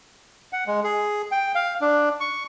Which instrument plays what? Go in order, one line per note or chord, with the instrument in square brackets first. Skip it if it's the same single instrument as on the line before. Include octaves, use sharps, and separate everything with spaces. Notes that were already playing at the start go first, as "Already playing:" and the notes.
[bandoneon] F#5
G#3
G#4
G5
F5
D4
C#6